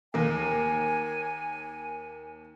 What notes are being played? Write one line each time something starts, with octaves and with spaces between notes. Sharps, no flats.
D#2 A#3 G#5